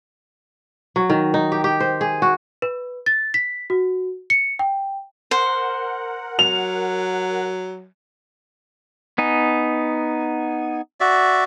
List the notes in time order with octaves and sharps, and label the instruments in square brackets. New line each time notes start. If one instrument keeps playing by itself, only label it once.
[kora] F#3
D#3
D#4
G4
G4
C5
G#4
F#4
[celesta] B4
A6
B6
F#4
C#7
G5
[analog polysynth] A#4 F#5 [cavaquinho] C5
[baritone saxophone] F#3 [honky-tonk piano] F7
[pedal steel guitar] B3 D#4 G#5
[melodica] F#4 D5 E5